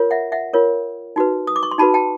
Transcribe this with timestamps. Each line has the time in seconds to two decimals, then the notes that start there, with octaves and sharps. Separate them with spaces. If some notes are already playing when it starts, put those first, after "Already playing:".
Already playing: F4 A#4 C#5
0.11 E5 F#5
0.32 E5 F#5
0.53 F4 A#4 C#5
1.16 D#4 F#4 B4
1.47 D#6
1.56 D6
1.63 C#6
1.71 C6
1.78 D#4 F#4 B4 A5 B5
1.94 G5 A5